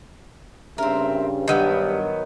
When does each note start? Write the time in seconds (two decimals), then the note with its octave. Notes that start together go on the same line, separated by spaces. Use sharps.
0.78 G2 C#3 C4 A#4 E5
1.48 G2 D#3 F#3 B3 G4